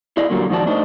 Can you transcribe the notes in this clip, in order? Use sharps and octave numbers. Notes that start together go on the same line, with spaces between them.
E4 G#4 D5 D#5 F5
A#2 D3 F#3 G3 A#3
G#2 D#3 F3 F#3 D5 A5
A3 D4 D#4 C5 D#5